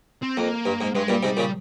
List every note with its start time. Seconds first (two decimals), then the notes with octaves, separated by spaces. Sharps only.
0.23 C4
0.37 F2 A#3
0.66 G2
0.81 G#2
0.95 G2 G#3
1.08 G2 A#2 G3
1.23 G#2 C3
1.37 A#2 C#3